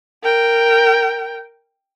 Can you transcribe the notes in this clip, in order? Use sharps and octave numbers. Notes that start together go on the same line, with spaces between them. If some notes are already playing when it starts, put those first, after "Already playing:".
A#4 G5